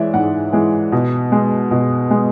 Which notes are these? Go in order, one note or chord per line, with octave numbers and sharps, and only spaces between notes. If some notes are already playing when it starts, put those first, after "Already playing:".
Already playing: E3 G#3 C#5 D5 E5
G#2 F#5
E3 G#3
B2
G#3
B2
G#3